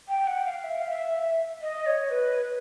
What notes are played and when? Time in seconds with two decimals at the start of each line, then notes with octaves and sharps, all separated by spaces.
0.08 G5
0.27 F#5
0.46 F5
0.64 E5
0.77 F5
0.90 E5
1.62 D#5
1.86 C#5
2.10 B4